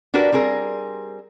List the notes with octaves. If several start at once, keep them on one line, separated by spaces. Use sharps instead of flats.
D4 F#4 G4 A#4 B4 D5
G3 C4 G#4 A#4